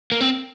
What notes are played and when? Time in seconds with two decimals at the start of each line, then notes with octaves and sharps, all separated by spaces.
0.12 A#3
0.21 C4